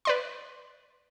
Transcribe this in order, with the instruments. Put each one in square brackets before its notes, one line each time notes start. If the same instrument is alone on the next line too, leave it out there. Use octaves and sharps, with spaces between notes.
[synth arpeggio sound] B4 D5 C6